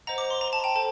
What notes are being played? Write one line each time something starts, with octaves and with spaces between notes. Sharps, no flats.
C5 D#5 F#5 A#5
D6
C6
A#5
A5
G5
A4 C5 A5